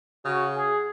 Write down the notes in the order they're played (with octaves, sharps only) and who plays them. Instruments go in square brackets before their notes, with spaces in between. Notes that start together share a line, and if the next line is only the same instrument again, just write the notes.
[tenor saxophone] C#3 [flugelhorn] F#4
[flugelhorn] G#4